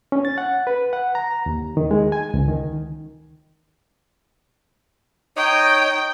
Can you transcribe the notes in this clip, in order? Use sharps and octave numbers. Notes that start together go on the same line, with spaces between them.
C#4
A6
F#5
B4
F#5
A#5
D#2
D#3
G#3
G#5
C#2
D#3
D#4 C#5 D#5 G5